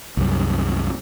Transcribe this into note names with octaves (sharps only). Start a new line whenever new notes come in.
C2 F#2